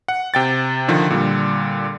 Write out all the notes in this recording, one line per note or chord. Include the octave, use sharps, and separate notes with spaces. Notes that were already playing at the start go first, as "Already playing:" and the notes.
F#5
C3 G5 A6
D3 D#3 F3
A#2 D3 G3